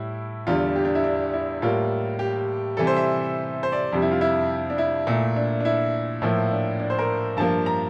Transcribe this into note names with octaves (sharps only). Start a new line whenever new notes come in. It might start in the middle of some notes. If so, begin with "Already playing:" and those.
Already playing: A2 G3 E4
E2 D3 G3 F4
G4
D4
E4
D4
E4
A2 G3 A#3 F4
G4
C3 E3 G3 A4
C5
E5
C5
D5
F2 C3 G3 D4
E4
F4
E4
D4
E4
A#2 A3
D4
D4
E4
A2 F3 A#3 E4
D4
D4
C5
A#4
G2 F3 A#3 A5
A#5